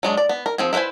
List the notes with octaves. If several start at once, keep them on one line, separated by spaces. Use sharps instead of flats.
F#3 G#3 D4
D5
B3
A#4
F3 C4 G#4
E4 F4 B4 C5 G#5